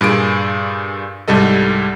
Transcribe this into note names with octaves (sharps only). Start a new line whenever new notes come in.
G2 A#2 G#4 D7
C2 G#2 G3 A4 D#5